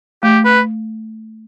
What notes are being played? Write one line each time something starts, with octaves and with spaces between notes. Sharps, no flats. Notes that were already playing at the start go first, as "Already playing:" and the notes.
A3 G4
B4